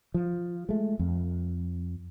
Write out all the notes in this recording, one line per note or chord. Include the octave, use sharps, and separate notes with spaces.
F3
G#3 A3
F2